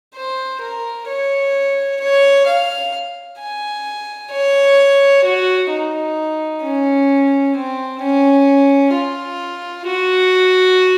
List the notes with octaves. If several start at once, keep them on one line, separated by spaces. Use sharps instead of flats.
C5
A#4
C#5
C#5
F5
G#5
C#5
F#4
D#4
C#4
C4
C#4
F4
F#4